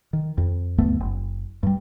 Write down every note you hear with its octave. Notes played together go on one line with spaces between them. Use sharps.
D#3
F2
D2 G2 A3 B3
F#1
G2 G3